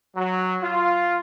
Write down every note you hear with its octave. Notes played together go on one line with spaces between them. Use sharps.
F#3
F4